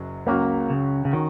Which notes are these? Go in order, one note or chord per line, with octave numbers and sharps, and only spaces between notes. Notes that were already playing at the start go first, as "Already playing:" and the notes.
Already playing: F#1 F#2 F#3
C#2 C#3 F#3 A#3 C#4 F#4
C#3
C#3
D#3 C#4 F#4